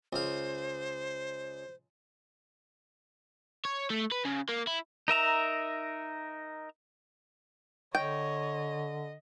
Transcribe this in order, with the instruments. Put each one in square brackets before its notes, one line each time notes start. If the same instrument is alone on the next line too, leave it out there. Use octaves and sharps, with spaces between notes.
[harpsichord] C#2 F5 [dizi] C5
[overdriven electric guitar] C#5
A3
B4
C#3
A#3
E4
[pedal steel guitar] D#4 A#4 E5 A#5
[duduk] D3 [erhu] C#5 [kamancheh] D#5 [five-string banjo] G5